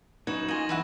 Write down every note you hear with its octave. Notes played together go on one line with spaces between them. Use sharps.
F#2 D#4 F#4 B4 G#6 E7
A#3 F4 D#5 G#5 C#6 A#6 F#7
F#2 D3 E3 B4 E5 F#5